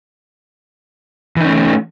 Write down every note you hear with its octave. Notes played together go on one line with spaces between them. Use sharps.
E3 A3 C#4 D#4